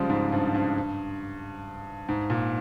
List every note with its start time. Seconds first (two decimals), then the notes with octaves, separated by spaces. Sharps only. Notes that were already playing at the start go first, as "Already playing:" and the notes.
Already playing: C#3 F3 G3 G#3
0.10 G#2
0.32 G2
0.55 G2
2.09 G#2
2.30 A#2